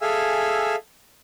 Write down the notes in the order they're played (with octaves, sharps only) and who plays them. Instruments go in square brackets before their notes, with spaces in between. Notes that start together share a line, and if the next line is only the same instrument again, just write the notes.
[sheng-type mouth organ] G#4 A4 E5 F5 G#5 E6